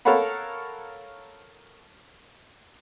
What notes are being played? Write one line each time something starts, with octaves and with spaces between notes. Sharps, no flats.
A4 A#4 C#5 F5 F#5 B5